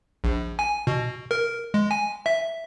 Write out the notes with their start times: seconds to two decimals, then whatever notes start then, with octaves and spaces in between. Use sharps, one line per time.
0.24 A#1
0.59 G#5
0.87 B2
1.31 A#4
1.74 G#3
1.91 G#5
2.26 E5